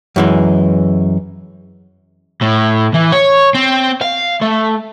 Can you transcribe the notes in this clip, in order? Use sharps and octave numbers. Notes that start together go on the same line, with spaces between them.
F#2 E3 G#3
A2
E3
C#5
C4
F5
A3